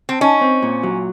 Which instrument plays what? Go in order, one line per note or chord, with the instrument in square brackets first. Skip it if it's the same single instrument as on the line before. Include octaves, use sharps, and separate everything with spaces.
[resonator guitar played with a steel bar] C4
[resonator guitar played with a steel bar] C#4 [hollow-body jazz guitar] D#4
[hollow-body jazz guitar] C4
A#2
F#3